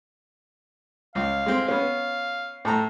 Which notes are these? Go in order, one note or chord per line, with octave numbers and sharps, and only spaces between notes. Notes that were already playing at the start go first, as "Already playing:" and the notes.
C#2 F5
G#3 C4
B3 C#4 F5
A2 A4 A#5